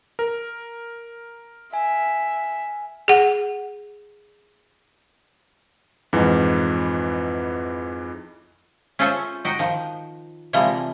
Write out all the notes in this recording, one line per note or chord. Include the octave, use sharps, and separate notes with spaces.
A#4
E5 G#5
G#4 F#5
F2 G#2 E3
C#4 F4 G#4 A4 C5 E5
D#4 F#4 G5
D#3 F3
C3 E3 F3 G3 G#3 A#3